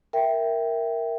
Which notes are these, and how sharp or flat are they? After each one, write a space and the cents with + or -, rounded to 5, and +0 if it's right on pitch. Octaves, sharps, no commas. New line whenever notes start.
A#4 +0 E5 +0 G5 +0